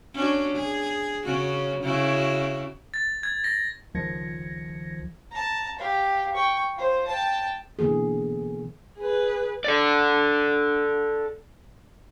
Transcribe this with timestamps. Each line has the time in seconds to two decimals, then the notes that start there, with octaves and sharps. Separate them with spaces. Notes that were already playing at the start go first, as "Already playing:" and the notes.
0.15 C#4 D4 F#4
0.54 G#4
1.25 C#3 C#4 F#4
1.83 C#3 E4 F#4
2.94 A6
3.23 G#6
3.44 A#6
3.94 C#2 D#3 F3 G#6 A#6 C#7
5.31 A5 A#5
5.79 G4 F5
6.34 G5 C#6
6.76 F4 C5
7.08 G5 A5
7.79 B2 D3 E3 A#3 G#4
8.98 G#4 B4
9.64 A4 D5